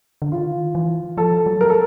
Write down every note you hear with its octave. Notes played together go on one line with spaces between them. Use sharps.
D3
D#3 F4
E3
F3 A4
F#3
A#4
A4